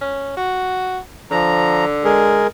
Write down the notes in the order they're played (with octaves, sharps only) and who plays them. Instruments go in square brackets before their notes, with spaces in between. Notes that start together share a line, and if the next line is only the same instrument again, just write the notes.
[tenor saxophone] C#4
F#4
[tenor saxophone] D3 [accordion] F3 A#5
[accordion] G#3 G#4 A#4